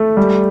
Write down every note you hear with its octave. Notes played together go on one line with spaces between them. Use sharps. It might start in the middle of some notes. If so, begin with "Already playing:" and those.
Already playing: A3
G3